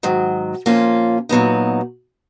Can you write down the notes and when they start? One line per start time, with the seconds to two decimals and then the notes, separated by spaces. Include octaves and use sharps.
0.03 G#2 D#3 F#3
0.66 A#2 F3 A#3 C#4 F4
1.29 A#2 F#3 B3 D#4